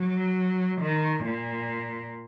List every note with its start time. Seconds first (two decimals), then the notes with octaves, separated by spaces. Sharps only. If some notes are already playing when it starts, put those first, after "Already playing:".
Already playing: F#3
0.81 D#3
1.24 A#2